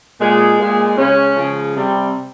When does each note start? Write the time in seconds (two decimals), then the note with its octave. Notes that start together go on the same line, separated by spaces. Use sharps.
0.20 A#2 G#3
0.59 A#2 G#3
0.97 C#3 G#3 C#4
1.36 C#3 F3 G#3
1.75 C3 G3